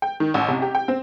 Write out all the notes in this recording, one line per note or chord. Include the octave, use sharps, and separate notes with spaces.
G5
D#3
A1
C3
G4
G5
C4